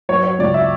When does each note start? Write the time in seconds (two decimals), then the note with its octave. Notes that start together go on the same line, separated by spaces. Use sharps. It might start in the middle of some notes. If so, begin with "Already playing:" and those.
0.09 F#3 C#5
0.24 C#5
0.39 C#2 D5
0.54 E5